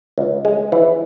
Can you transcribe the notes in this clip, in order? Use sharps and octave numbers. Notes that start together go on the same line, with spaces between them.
C#2
G#3
E3